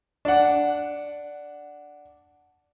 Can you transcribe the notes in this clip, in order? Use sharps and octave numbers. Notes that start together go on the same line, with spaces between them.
D4 F#5